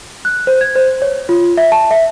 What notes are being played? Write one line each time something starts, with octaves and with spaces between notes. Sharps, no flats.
F#6
C5
G#6
C5
C#5
F4
E5
A5
E5